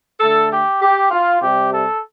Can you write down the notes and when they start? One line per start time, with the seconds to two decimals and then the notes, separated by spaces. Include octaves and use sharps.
0.20 D3 A3 A4
0.50 G4
0.81 G4
1.11 F4
1.41 C3 G3 G4
1.72 A4